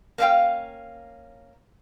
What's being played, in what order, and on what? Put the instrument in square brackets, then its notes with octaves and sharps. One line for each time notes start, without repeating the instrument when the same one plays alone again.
[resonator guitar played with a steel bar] A#3 C#4 D4 E4 F5 G5